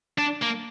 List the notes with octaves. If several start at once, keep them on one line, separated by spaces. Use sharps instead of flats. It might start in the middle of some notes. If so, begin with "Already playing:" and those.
D4
A#3